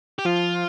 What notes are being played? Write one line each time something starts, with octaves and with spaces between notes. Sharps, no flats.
G4
F3 F4